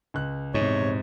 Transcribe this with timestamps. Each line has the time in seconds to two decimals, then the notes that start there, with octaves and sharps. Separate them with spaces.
0.14 C#2 F#6
0.54 A#1 E2 G#2 C3 D#4 C#5